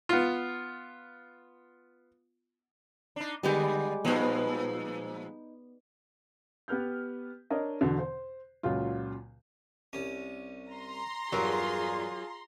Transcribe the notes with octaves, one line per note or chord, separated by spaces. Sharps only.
B3 F4
D4 D#4
D3 G3 G#3 B3 G4
A#2 F3 G#3 B3 D#4
B3 G4 B4 F6 G6
D4 A#4 C#5 D#5
E2 B2 D3
C5
C#2 A#2 C#3 F#3 F4
C2 C#4
A#5 C6
E2 G2 F#3 F4 G#4 A#4